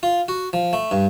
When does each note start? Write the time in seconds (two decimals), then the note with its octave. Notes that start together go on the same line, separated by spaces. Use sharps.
0.03 F4
0.28 F#4
0.53 F3
0.73 A3
0.91 G2